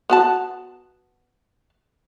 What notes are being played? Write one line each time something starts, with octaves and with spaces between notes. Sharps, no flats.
B3 F#4 A5